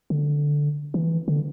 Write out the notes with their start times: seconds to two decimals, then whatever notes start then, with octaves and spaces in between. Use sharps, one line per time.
0.10 D3
0.94 E3
1.28 D3